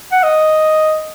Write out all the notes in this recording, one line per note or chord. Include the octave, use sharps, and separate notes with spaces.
F#5
D#5